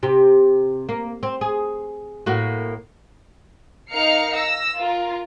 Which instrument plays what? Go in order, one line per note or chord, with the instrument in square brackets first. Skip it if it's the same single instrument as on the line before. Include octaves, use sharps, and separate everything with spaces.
[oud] C3 G4
A#3
C4
G#4
A2 A#3 F#4
[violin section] D#4 A#4 F5 F6 C7 C#7
E6 A#6
F4 A#4